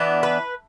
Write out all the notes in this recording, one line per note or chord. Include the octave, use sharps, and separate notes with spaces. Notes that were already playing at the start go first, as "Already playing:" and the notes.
Already playing: E3 B3 D4
B4